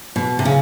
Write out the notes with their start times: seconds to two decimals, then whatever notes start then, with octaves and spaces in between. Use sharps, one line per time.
0.16 B2
0.39 C3
0.45 C#3